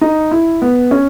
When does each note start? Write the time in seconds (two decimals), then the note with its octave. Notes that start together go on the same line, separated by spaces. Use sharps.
0.01 D#4
0.31 E4
0.62 B3
0.91 C#4